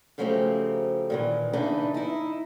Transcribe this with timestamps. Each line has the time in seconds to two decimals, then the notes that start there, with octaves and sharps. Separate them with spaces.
0.18 C#3 F3 F#3 A3 C4 G4
1.10 A#2 D#3 E3
1.53 E2 C#3 E3 D4 D#4 B4
1.94 D#4 E4